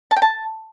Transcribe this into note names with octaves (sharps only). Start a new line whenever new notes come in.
A5
G5
A5